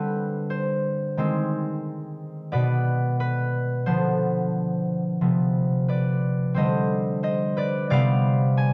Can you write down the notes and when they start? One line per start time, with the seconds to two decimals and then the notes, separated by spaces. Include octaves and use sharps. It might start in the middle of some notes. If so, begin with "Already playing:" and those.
Already playing: D3 G3 C4 B4
0.50 C5
1.17 D#3 G#3 C4
2.52 B2 B3 B4 D5
3.20 B4
3.86 D3 F3 B3 C5
5.21 C3 F3 B3
5.88 B4 D5
6.54 D3 G3 C4 C5 D#5
7.23 C5 D#5
7.57 B4 D5
7.90 C3 G3 B3 D5 F5
8.57 G#5